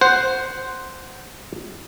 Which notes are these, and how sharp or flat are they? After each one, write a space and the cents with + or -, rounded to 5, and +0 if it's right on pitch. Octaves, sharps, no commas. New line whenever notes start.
C5 -5 F#5 +10